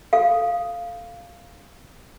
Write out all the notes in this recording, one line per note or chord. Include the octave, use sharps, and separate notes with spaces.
A4 F5